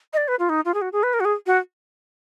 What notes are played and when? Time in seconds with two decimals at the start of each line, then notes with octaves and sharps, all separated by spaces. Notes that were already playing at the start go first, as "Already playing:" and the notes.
0.13 D#5
0.17 D5
0.28 B4
0.39 F4
0.49 D#4
0.65 F4
0.74 G#4
0.81 F#4
0.92 G#4
1.03 B4
1.14 A#4
1.20 F#4
1.25 G#4
1.46 F#4